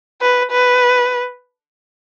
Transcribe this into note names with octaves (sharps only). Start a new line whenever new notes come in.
B4
B4